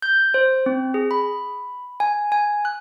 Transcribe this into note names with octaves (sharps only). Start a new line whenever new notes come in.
G6
C5
C4
G#4
B5
G#5
G#5
F#6